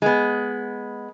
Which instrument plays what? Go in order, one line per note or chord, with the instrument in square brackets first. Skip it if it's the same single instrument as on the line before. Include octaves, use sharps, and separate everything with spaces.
[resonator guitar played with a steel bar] G#3 B3